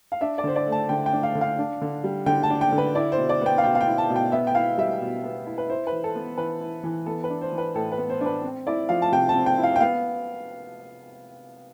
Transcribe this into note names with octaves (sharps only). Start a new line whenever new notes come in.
F5
D4 E5
D5
D3 C5
D5
A3
A5
D3 G5
G5
D4
F5
D3
F5
D4
D3
G3
D3 G5
A5
D4
G5
D3
B4
E4 D5
C5
B2
D5
B3 G5
F5
B2 G5
F5
G5
E4
A5
B2
G5
B3 E5
G5
E4 F5
G3 E5
B2
B3
E4
B4
E4 C5
B4
E3
A4
B3
E3 B4
E4
E3
B3 A4
B4
D4
C5
E3
B4
A2 A4
B4
B3
C5
D4
B4
C4
E4 D5
F3 F5
A5
C3 G5
A5
C4
G5
E4
F5
G5
B3 F5